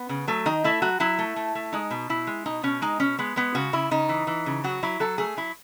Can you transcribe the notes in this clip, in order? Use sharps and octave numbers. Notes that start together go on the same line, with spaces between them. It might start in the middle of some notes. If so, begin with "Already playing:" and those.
Already playing: B3
C#3
F#3 A3
D#3 D#4
A3 E4
F#3 F#4
F#3 E4
A3
A3
A3
G#3 D#4
B2
B2 E4
G#3
B2 D#4
B2 C#4
G#3 D#4
B2 C#4
G#3 B3
G#3 B3
C#3 F#4
C#3 E4
C#3 D#4
E3
E3
C#3
F#3 F#4
F#3 E4
F#3 A4
A3 G#4
F#3 E4